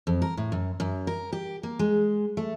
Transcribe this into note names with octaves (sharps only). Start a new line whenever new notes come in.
F2
A#4
A2
F#2
F#2
A#4
G4
A#3
G#3
A3